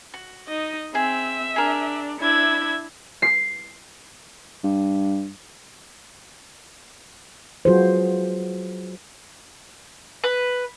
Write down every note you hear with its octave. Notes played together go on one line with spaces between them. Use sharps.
F#4
D#4 D#5
C4 G#4 E5
D4 G#4 A#4
D4 E4 E5 G#6
C7
G2
F#3 F4 F#4 G#4 B4 C5
B4